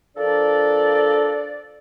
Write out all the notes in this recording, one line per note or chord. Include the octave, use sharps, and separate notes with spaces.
F3 D4 A4 A#4 D5